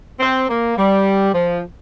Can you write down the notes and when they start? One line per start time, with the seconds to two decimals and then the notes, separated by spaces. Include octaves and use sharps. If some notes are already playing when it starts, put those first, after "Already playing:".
0.20 C4
0.49 A#3
0.77 G3
1.34 F3